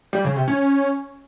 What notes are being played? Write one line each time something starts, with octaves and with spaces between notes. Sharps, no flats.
G3
C#3
C3
C#4